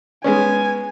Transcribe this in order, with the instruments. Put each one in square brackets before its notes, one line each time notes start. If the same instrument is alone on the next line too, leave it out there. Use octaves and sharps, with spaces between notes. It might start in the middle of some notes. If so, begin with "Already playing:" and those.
[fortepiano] G#3 B3 C#4 [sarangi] G#5